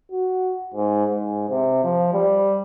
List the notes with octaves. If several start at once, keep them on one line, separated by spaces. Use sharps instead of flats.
F#4
G#2
G#2
C3
F3
G3